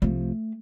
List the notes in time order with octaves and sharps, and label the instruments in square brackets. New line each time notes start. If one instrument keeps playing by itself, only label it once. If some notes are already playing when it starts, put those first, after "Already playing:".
[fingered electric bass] C2 C3 F3 [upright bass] A3